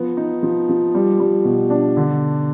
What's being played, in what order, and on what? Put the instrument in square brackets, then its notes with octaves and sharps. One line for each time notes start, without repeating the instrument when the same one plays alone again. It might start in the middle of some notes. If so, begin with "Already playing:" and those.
Already playing: [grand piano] F3 B3
D#4
F3
F3
G3
G3
B2
D4
D3